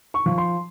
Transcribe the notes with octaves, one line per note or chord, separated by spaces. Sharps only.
C#6
F3
C6